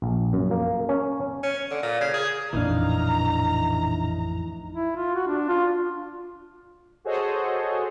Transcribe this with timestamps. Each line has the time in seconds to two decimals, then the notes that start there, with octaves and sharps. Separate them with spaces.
0.02 A#1
0.33 F#2
0.51 A#3
0.89 C#4
1.43 C#4
1.71 D3
1.83 A#2
2.01 C#3
2.14 G#4
2.53 A1 F2 A#2 E3 D4 D#4 F5 A#5
4.73 E4
4.96 F4
5.15 F#4
5.27 D4
5.49 F4
7.04 F#4 G#4 A4 C5 C#5 D#5